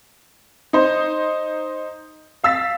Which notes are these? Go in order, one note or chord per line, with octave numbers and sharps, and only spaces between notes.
D#4 C5
F5 E6 A6 B6